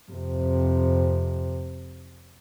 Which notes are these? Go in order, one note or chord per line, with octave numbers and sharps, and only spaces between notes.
F2 C3